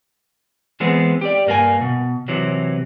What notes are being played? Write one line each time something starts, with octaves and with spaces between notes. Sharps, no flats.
E3 G#3 B3 C4
G4 D5
G2 A#3 F#4 G#5
B2
C3 E3 F#3